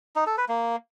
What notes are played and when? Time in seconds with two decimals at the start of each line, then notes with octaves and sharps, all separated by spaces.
0.16 D#4
0.27 A4
0.38 B4
0.48 A#3